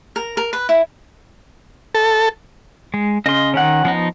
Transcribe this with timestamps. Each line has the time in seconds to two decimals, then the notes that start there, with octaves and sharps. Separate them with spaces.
0.16 A#4
0.37 A#4
0.53 B4
0.69 E4
1.95 A4
2.94 G#3
3.26 C#3 D#5 C6
3.54 D#3 C#4 F#5
3.85 F3 B3 D#4